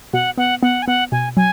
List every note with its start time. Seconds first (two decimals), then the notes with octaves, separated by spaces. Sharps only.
0.13 B2 F#5
0.38 B3 F#5
0.62 B3 F#5
0.82 G#5
0.87 B3 F#5
1.12 B2 G#5
1.37 F#3 G#5